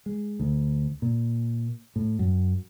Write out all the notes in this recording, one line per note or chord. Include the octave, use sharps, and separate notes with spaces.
G#3
D2
A#2
A2
F#2